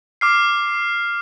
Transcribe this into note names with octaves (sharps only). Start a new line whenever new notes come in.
D6 F6 C7